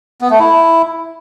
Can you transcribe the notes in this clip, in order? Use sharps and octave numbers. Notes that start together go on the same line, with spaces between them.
B3
A3
E4